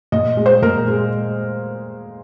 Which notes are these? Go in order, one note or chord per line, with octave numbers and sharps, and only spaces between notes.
A#2 D#5
G#3
C5
A#2 A#4
G#3